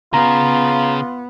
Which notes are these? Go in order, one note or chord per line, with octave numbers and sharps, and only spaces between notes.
C#3 B3 F4 G#4 A#5